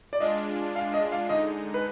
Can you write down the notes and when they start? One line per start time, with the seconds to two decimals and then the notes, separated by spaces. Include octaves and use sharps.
0.13 D5
0.20 G#3 D4 F4 D#5
0.76 F5
0.94 D#5
1.12 F5
1.29 D3 G#3 D#4 D#5
1.74 B4